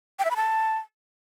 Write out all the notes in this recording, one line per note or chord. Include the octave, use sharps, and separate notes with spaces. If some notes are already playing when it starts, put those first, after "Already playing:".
G5
E5
B5
A5